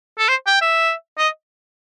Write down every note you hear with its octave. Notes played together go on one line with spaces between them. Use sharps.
A4
C5
G5
E5
D#5